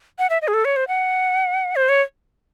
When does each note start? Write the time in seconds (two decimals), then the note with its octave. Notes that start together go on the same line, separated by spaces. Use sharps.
0.19 F#5
0.30 E5
0.42 D#5
0.48 G#4
0.54 A4
0.65 C#5
0.76 C5
0.88 F#5
1.76 C5
1.89 C#5